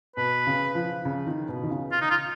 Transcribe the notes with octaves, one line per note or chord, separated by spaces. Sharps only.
B2 B4
C#3
F3
C#3
D#3
B2
D#3
C#3
F4
D#4
F4